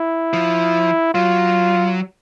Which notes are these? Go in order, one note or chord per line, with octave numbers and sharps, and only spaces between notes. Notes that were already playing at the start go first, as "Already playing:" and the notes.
Already playing: E4
F3
F#3 F4